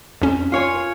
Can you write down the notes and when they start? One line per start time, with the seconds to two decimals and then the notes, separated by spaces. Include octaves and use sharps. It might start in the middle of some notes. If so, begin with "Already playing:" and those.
0.22 F2 C#4
0.52 F4 C#5 G#5